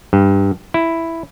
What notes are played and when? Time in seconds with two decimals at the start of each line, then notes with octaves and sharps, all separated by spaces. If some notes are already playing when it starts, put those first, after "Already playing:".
0.13 G2
0.74 E4